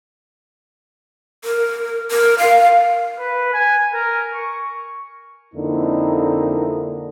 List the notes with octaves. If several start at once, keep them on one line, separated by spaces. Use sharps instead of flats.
A#4
A#4
F5
B4
G#5
A#4
C#6
F2 D3 A#3 C4 D#4 E4